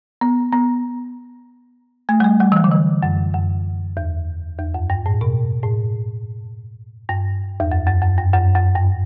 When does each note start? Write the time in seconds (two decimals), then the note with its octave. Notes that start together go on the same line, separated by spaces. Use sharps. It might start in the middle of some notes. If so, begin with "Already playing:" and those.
0.21 B3
0.52 B3
2.09 A3
2.20 G3
2.24 A3
2.40 G3
2.52 E3
2.56 F#3
2.64 D3
2.71 E3
3.03 F#2
3.34 F#2
3.97 E2
4.59 E2
4.74 F#2
4.90 G2
5.06 A2
5.21 B2
5.63 A2
7.09 G2
7.60 E2
7.72 F#2
7.87 F#2
8.02 F#2
8.18 G2
8.34 F#2
8.55 F#2
8.75 G2